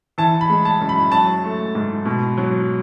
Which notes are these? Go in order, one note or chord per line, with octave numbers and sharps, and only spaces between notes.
E3 A5
B5
G#3
A5
F#2
B5
F#3 A5
A3
G#2
B2
F#3